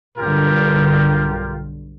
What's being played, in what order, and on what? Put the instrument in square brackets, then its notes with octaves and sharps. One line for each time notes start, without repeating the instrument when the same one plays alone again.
[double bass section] B1 G2 D3 [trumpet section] F4 G4 A#4